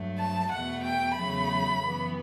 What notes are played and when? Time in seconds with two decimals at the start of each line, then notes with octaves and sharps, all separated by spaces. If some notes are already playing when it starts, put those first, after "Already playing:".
Already playing: G2 F#3 A3
0.19 A5
0.52 E2 B2 A3 F#5
0.85 G5
1.16 E2 C#3 F#3 A3 B5
1.81 F#2 E3 B3